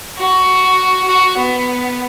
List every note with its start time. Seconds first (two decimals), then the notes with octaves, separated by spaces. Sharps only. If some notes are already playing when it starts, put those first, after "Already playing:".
0.17 F#4
1.07 F#4
1.37 B3